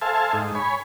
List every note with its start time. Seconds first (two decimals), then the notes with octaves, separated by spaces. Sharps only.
0.02 A4 C5 E5 F5 G#5 A5
0.33 G#2 D#4
0.55 C#5 G#5 B5